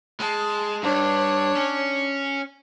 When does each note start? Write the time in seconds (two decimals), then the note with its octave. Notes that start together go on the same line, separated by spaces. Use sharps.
0.20 G#3 A5
0.83 G2 D4 C#5
1.56 C#4